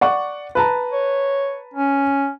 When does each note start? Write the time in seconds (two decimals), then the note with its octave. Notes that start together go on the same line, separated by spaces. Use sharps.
0.01 D5 F#5 C#6
0.55 B4 A5 A#5
0.93 C#5
1.74 C#4